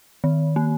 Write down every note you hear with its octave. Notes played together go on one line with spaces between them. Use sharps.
D#3
A#3